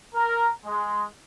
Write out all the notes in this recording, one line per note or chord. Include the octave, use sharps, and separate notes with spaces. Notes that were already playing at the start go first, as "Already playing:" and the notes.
A#4
G#3